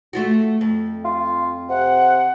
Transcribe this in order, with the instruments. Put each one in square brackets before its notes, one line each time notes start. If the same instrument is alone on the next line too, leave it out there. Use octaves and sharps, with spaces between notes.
[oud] A3 F4 F#4
F2
[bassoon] F4
[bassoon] C3 [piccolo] F#5